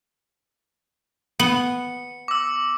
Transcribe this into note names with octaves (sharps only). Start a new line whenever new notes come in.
B3 C#7
D6 E6